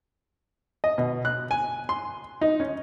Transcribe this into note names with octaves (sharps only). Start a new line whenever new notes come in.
D#5
B2
F#6
G#5
C6
D#4
C#4